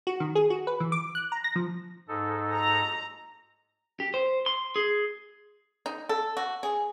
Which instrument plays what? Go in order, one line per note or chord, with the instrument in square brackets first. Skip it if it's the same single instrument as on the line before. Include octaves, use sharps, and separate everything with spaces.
[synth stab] F#4
D#3
G#4
F#4
B4
E3
D6
F#6
A#5
A#6
F3
[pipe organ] G#2 D#4 A4
[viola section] A#5
[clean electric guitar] G4
C5
C6
G#4
[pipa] D#4
A4
F#4
G#4